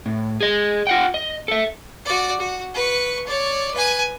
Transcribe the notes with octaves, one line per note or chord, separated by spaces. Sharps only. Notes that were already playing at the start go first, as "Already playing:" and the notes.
A2
G#4 D#5
F4 F#5 G5
D#5
A4 E5
F#4 D5
F#4
B4 C#6
C#5 D5
B4 G#5